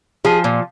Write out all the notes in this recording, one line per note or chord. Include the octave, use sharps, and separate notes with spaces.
F3 G#4
A#2